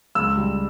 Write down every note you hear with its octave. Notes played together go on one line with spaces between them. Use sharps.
C#2 E6
G3